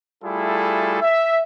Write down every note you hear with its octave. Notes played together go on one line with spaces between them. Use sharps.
G3 A3 E4 F4 G#4 A4
E5